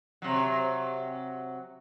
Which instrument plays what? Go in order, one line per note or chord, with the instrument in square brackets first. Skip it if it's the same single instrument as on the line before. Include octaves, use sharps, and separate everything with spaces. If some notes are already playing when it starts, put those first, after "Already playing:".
[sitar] C3 F#3